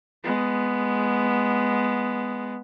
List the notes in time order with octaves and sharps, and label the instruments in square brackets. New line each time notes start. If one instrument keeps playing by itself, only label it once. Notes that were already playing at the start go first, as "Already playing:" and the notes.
[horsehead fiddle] G#3 B3